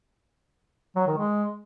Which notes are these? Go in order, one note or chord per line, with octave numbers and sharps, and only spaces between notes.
F#3
D#3
G#3